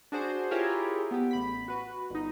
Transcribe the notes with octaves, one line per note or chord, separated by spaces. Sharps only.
D4 F#4 G#4 C5
E4 F4 G4 G#4 A#4 C#5
B3 G4
A1 B5 B6
F#4 B4
G1 D#4